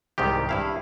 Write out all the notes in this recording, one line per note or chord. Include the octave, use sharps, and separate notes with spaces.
C2 G#2 D#3 G4
G2 E4 F5